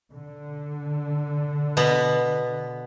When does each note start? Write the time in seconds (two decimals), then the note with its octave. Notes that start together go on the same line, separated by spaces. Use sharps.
0.12 D3
1.77 B2 B3